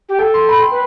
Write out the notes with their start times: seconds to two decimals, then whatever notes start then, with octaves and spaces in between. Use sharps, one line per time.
0.09 G4
0.19 A4 G5
0.34 C6
0.49 B5
0.59 C6
0.71 B4